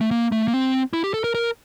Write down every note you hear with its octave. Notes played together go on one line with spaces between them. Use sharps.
A3
A#3
A3
A#3
C4
E4
G4
A4
A#4
A#4